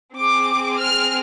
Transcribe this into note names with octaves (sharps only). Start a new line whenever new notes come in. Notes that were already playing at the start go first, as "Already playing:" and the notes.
C4 G#4 D6
F6